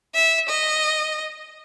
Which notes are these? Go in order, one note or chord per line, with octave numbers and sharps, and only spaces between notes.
E5
D#5